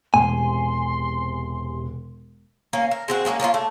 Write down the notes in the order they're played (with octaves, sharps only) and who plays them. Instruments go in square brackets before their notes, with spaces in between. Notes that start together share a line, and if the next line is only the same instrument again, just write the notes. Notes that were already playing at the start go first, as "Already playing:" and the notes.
[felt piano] E1 [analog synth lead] C3 [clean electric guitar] G#5 [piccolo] C6
[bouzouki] A#3 C#4
A#4
G#3 C4 F#4
G#3 A#3 B3 C#4
A#3 C#4 D#4 F4
A3